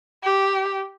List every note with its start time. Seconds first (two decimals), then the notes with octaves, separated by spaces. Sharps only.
0.24 G4